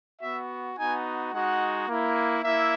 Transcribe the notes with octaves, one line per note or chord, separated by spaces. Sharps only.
B3 F#4 E5
B3 D#4 F#4 G#5
G#3 D#4 F#4 F#5
A#3 E4
A#3 E4 E5